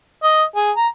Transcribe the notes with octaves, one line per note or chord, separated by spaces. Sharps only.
D#5
G#4
A#5